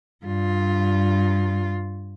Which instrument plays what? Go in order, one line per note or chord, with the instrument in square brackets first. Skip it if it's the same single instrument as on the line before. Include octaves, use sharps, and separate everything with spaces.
[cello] G2 F4